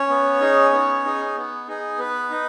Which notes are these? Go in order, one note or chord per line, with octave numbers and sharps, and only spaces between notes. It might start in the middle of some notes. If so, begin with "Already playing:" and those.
Already playing: C#4 C#5
B3
D#4 G#4
B3
D#4 G#4
B3
D#4 G#4
B3 B4
D#4